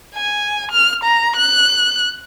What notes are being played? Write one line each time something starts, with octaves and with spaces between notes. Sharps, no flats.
G#5
F6
A#5
F#6